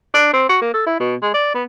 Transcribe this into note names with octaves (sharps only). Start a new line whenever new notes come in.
D4
C4
F#4
A#3
A4
E4
B2
G#3
D5
B3